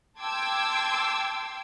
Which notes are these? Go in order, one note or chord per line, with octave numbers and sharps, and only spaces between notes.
G5 A5 C6 D6 E6 G#6